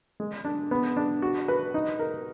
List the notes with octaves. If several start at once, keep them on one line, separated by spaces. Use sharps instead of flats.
G#3
D4
B3
D4
F#4
B4
D#4
A#4